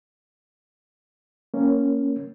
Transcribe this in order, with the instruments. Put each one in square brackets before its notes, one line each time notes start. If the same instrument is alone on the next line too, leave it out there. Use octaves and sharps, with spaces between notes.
[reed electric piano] A#3 C#4